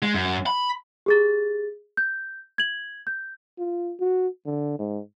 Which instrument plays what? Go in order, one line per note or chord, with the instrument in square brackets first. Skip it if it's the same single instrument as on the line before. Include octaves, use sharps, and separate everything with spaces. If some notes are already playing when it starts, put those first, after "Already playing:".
[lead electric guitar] G#3
F#2
B5
[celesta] G4 G#4 A6
G6
G#6 F#7
G6
[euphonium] F4
F#4
D3
G#2